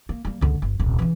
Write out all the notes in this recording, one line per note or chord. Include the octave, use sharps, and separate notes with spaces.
A#3
G3 A#3
C#2 D3
G1
D#1 C2
C#3 E3